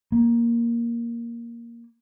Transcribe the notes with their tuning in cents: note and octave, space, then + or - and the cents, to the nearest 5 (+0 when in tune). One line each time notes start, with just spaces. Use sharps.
A#3 +5